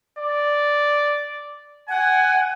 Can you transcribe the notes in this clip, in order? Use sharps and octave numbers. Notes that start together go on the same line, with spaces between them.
D5
F#5 G#5